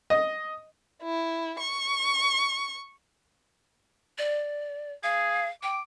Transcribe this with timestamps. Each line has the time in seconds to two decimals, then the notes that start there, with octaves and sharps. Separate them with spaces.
0.10 D#5
1.03 E4
1.60 C#6
4.18 D5
5.03 G#4 F5
5.63 G5 D6